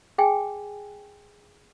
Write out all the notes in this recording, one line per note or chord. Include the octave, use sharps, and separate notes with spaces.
G#4 G5 G#5